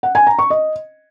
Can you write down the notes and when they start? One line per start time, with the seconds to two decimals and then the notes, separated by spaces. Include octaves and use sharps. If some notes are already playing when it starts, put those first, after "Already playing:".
0.03 F#5
0.15 G#5
0.27 A#5
0.39 C#6
0.50 D#5